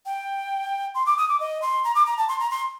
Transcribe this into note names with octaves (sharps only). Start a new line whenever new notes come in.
G5
C6
D6
D#6
D6
D#5
C6
A#5
D6
A#5
A5
C6
A#5
C6